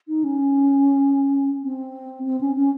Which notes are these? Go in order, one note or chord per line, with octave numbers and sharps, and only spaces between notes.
D#4
C#4
C4
C4
C#4
C#4